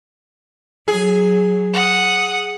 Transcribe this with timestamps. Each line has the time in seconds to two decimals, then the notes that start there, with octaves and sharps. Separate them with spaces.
0.88 F#3 G#4
1.74 F#5 D#6